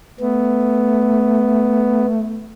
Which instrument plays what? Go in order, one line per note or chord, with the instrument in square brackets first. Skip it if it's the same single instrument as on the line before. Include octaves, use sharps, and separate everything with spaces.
[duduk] A3 [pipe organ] B3